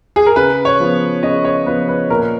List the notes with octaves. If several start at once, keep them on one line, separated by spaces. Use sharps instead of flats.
G#4
A#4
C#3 B4
C#5
F3 B3
C#3 D#5
C#5
F3 B3 B4
B4
A#2 A#4